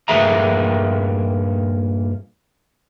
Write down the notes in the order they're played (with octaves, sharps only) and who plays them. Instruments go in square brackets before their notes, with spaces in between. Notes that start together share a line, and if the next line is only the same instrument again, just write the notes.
[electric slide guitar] G2 A#2 A#3 G#4 E5 A#5